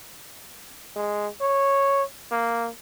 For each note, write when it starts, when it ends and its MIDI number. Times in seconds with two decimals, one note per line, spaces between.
0.96 1.27 56
1.41 2.03 73
2.31 2.68 58